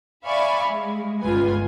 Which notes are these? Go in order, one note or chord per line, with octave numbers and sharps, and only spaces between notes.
D5 E5 F5 G#5 B5 C#6
G#3
G1 C#2 F4 B4 G#5